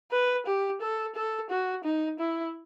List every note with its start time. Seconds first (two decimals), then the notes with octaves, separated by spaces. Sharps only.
0.12 B4
0.46 G4
0.81 A4
1.15 A4
1.50 F#4
1.84 D#4
2.19 E4